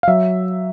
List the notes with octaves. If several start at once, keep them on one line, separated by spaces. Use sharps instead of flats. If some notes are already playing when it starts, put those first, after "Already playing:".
F5
F#3 E5